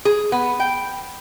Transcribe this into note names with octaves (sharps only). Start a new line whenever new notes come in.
G#4
B3
G5